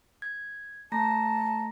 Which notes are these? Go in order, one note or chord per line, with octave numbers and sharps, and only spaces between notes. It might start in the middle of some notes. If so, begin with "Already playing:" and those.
G#6
A3 A5 A#5 A#6